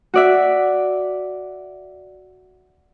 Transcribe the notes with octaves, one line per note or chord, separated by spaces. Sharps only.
F#4 D5 E5